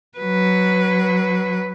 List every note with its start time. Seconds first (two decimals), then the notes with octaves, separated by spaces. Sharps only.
0.18 F#3 B4